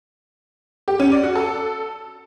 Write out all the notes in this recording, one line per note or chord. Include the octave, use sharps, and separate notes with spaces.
G4
C#4
D5
F#4
A4